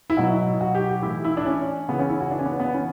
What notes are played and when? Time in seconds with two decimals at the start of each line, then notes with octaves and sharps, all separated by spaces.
0.10 E4
0.17 B2 F#3 F#4
0.61 F#4
0.75 G4
0.89 G4
1.02 A2 E3 E4
1.25 E4
1.37 D4
1.46 C#4
1.89 C#3 E3 B3
1.99 C#4
2.09 E4
2.20 F#4
2.31 D4
2.39 C#4
2.45 B3
2.60 B3
2.73 E3 C#4